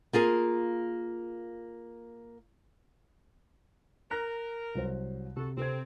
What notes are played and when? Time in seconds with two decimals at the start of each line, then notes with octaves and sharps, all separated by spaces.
0.13 A#3 F4 G#4 A#4
4.11 A#4 A#5 F#6 A#6
4.75 C2 F#3 C5
5.36 C3 F#4 A4
5.57 C3 C4 A4 G#6